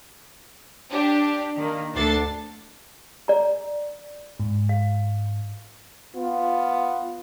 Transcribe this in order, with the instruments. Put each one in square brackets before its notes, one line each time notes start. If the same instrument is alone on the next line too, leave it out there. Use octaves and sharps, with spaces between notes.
[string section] D4 G4
D#3 A#3
D2 D4 A4 A6 C7
[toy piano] D5 A#5
[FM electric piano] G#2
[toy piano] F5
[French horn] B3 [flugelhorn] F4